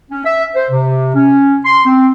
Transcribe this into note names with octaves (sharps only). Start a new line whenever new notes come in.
C#4
E5
C5
C3
C#4
C6
C4